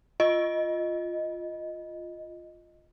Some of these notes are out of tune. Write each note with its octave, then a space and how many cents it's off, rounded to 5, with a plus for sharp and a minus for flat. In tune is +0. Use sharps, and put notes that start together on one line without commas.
F4 +0 D#5 +0